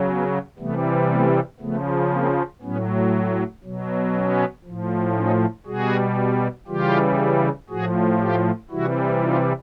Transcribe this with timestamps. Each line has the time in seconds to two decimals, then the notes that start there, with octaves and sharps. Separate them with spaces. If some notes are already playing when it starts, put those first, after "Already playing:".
Already playing: C#3 F#3
0.08 B3 C#4
0.59 C3 E3 G3 A3 B3
1.10 A3 B3
1.60 C#3 F3 A3 B3
2.11 A#3 C4
2.62 A2 F#3 B3 C#4
3.64 B2 F#3
4.14 B3 C#4
4.65 A2 F3
5.16 C#4 D#4
5.66 B2 G3 F#4 G#4
6.67 C#3 E3 G3 F4 G4
7.69 A2 F3 F#4 G#4
8.20 F4 G4
8.70 C3 E3 G3 E4 F#4
9.22 D#4 F4